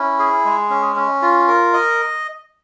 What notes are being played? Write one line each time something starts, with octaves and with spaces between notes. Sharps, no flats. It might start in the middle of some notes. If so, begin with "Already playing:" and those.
Already playing: C#4 E4
G#4
G#3
C#4
C#4
F4
A#4
D#5